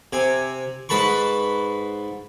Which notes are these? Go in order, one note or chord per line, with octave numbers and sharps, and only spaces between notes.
C3 G#5
G#2 B4 A5 B5 C#6